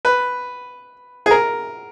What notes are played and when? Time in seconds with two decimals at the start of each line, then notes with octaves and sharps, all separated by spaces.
0.05 B4
1.26 G#4
1.31 A#4